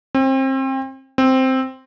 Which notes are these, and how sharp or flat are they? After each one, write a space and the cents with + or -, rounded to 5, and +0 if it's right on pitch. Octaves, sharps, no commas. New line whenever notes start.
C4 +30
C4 +0